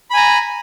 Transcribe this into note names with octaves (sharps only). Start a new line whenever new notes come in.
G#5 A#5 B5